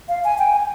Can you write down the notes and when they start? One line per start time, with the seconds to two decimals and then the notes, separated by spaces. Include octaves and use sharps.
0.09 F5
0.24 G#5
0.39 G5
0.54 G#5